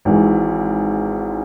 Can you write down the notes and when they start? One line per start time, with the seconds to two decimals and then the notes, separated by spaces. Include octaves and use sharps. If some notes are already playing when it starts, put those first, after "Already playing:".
0.05 G#1 G#2 E3 G#3